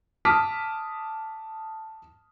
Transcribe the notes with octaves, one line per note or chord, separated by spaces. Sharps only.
A5 D6 D#6 F6 B6